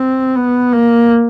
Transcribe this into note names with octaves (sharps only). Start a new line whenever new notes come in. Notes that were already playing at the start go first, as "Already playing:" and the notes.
Already playing: C4
B3
A#3